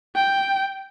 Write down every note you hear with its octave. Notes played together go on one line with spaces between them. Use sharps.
G5